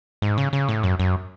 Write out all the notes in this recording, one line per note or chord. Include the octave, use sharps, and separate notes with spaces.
G#2
C#3
C#3
A2
F#2
F#2